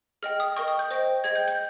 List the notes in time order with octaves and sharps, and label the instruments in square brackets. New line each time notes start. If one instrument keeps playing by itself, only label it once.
[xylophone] G#4 D#5 G5 F6
D#6
A#4 D#5 G5 C#6
D#6
G6
C5 D#5 G5
G#4 D#5 G5 G#6
G6
G6